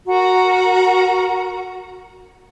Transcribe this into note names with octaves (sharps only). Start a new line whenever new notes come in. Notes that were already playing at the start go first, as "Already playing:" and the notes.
F#4 A#4 A#5